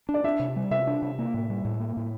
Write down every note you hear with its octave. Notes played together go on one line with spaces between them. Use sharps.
D4
D5
D4 E5
C3
G3
C3 E5
D4
C3
A#3
A2
G3
A2
A#3
A2